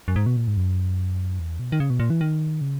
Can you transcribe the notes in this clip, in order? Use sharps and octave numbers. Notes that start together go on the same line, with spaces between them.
F#2
G#2
B2
A#2
G#2
F#2
E2
B2
D#3
C#3
B2
A#2
E3
D#3
C#3